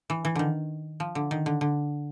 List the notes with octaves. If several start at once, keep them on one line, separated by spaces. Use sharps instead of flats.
E3
E3
D3 D#3
F3
D3
D#3
D3
D3